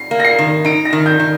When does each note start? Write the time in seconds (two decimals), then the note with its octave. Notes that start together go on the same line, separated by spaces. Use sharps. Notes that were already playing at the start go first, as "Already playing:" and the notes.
Already playing: C7
0.11 A#3
0.20 A#6
0.25 C7
0.39 D#3
0.65 D#4 D7
0.85 A#6
0.93 D#3
1.06 G6
1.20 D#3